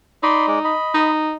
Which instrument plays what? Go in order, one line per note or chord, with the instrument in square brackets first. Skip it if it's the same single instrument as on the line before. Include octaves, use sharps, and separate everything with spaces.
[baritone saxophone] D#4 [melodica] D5 B5 C6
[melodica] G#3 D5
D#5 B5
[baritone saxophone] D#4